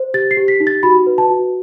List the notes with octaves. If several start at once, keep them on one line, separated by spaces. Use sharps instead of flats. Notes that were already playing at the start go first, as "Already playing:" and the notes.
Already playing: C5
G4 A6
C7
G4
B6
D#4
A6
F#4 B5
B4
A5
F#4